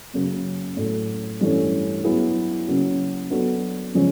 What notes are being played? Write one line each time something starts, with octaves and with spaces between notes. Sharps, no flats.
F#2 C#3 F#3 A#3
A2 F#3 A3
G2 E3 A3 C#4
F#3 B3 E4 G#4
C#3 F#3 A#3 C#4
F#3 B3 D4 F#4 A4
C#3 F3 G#3 C#4